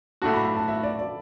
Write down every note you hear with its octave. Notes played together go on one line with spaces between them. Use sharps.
A2 A3 D4 F#4 A5
B5
B5
A5
E5
D5
D5